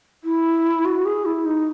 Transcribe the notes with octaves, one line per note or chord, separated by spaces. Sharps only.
E4
F#4
G#4
E4
D#4